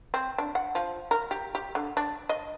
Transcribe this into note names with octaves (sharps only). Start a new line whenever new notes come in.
C4
D4
F#5
F3
A#4
G4
G4
D3
D4
D#5